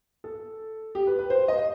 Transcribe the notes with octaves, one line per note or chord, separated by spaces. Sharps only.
A4
G4
B4
B4
C5
D#5